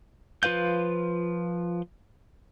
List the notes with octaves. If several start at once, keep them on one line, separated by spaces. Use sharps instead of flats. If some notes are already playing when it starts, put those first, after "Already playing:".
F3 F4 B4 F5 G6